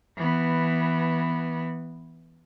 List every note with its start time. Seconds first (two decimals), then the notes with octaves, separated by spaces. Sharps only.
0.17 E3 B3